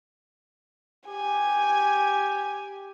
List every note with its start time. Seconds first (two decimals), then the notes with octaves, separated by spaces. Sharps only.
1.08 G4 G#5